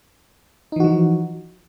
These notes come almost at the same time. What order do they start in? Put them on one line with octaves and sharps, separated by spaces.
D#4 E3 F#4 F3